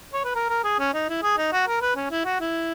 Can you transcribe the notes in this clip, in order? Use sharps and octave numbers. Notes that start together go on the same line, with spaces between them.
C#5
B4
A#4
A#4
G#4
C#4
D#4
E4
G#4
D#4
F#4
A#4
B4
C#4
E4
F#4
E4